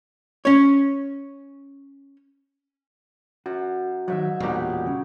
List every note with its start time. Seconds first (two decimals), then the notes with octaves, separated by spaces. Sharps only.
0.45 C#4 C#5
3.46 F#2 F#4
4.08 G#2 D#3 F#3 E5
4.40 E1 A#2 F#3 G3 D#4 G4
4.87 C#3